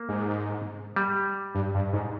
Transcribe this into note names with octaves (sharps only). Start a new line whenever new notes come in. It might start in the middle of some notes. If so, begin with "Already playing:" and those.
Already playing: A#3
G#2
G3
G2
G2
G#2